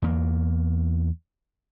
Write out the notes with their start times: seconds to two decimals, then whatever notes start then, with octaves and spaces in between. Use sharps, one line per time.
0.02 E2 A#3